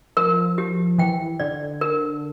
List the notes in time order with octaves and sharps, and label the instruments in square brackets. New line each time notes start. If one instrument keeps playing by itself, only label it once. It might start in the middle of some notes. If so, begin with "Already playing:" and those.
[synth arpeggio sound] F3 [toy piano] A#4
[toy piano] G4
[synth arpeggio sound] E3 [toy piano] G5
[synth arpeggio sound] D3 [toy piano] D5
[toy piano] A#4